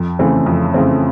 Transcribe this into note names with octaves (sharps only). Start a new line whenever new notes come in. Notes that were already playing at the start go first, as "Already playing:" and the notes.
Already playing: F2
C#3 E3 A3 C4
F2
C#3 E3 A3 C4